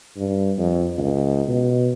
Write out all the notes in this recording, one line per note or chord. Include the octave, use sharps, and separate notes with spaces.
G2
F2
C#2
B2